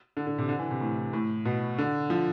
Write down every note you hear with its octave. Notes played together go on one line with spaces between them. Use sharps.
D3
D3
C3
D3
E3
C3
A2
A2
B2
D3
F3